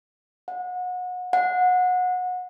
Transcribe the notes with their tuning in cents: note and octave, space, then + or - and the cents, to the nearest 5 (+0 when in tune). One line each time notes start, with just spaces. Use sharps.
F#5 -30
F#5 -25